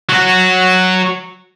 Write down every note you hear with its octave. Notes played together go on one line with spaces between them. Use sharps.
F#3 F#4